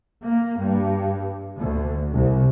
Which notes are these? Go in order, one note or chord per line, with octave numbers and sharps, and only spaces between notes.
A#3
G2
D2
C2